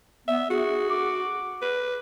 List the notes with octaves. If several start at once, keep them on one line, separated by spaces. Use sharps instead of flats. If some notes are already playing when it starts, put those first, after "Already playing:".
B3 E5
F#4 G#4
D6
B4